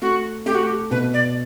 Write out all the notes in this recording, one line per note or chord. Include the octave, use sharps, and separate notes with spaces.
A3 F#4
A3 G4
F#4
G4
B2 B4
D5